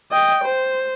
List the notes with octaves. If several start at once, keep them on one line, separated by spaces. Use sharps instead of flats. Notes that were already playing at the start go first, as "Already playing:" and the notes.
D#5 G5
C5